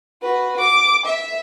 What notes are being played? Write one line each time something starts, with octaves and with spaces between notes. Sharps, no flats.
F#4 B4
D6
E5